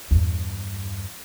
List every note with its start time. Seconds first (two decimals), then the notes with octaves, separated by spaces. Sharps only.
0.11 E2 G2